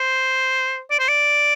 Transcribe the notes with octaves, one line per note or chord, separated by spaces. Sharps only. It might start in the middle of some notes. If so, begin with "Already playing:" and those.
Already playing: C5
D5
C5
D5